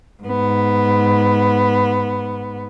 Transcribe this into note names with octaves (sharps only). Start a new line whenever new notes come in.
G#2 B3